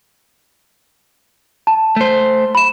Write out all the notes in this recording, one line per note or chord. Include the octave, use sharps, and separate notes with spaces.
A5
A3 C5
B5 E7